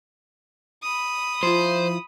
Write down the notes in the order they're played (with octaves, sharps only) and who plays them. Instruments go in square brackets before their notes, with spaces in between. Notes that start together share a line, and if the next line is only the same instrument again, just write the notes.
[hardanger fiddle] B5 D#6
[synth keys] F3 E4 F4 [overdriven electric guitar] C5